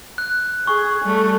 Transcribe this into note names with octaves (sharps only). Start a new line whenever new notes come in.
F#6
G#4 C#6
G3 A3